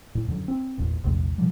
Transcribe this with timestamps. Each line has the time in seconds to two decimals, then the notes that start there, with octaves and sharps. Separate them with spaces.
0.15 A2
0.28 F#2 D3 F#3
0.48 C4
0.78 G#1 E2 A#2
1.04 A#1 E2 C3 A3
1.38 B2 D3 F3 G3